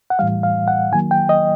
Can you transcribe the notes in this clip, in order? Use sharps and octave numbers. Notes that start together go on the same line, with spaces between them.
F#5
A2 E3 G3 F5
F5
F#5
D#3 F#3 A#3 G#5
G5
D#5